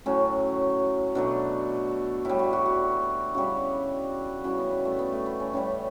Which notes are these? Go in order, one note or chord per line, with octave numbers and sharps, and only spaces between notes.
A2 F#3 A3 C#4
B2 F#3 A3 D4
A2 G3 E4
F#4
F#4
F#4
C#3 G3 F#4
C#3 E3 G3 F#4
B3
B3
A3
B3
A3
B3
C#4
A2 E3 G3 C#4